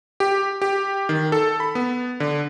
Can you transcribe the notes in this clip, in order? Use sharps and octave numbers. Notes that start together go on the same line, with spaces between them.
G4
G4
D#3
A4
B5
B3
D3